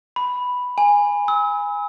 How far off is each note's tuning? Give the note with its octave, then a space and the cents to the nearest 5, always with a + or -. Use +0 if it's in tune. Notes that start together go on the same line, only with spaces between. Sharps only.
B5 +0
G#5 -15
E6 -40